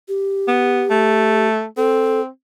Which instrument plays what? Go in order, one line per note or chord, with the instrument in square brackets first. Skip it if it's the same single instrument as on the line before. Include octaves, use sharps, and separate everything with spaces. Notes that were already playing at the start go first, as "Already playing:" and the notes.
[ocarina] G4
[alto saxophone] B3
A3
[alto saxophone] C4 [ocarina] A4